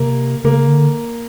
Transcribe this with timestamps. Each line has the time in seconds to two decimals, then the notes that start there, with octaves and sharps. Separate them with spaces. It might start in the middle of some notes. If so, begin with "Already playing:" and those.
Already playing: C3 A#3
0.44 C#3 A#3
0.67 D3